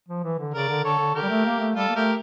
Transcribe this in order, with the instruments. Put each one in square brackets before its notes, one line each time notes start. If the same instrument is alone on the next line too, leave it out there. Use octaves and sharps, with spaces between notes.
[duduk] F3
E3
D3
[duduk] C#3 [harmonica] A#4 D5
[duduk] D3
[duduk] D3 [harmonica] A4 C#5
[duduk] D3
[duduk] D3 [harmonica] G4 A#4
[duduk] G3
A3
A#3
A3
[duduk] G3 [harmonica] F4 A4
[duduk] A#3
[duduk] A3 [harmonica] G4 A#4